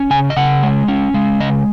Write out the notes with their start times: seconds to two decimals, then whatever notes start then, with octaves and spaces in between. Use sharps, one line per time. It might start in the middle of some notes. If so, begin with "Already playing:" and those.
Already playing: C#4
0.10 C#3 G#5
0.30 D#5
0.36 C#3 F#5
0.63 G#3
0.88 C#4
1.14 G#3
1.40 C#3 D#5